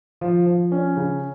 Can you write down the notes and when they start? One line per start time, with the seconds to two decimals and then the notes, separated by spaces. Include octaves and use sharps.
0.21 F3
0.46 F3
0.72 C#4
0.97 C#3